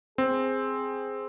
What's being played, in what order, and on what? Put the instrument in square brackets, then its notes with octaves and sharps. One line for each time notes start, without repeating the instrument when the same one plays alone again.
[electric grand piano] C4 [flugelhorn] G#4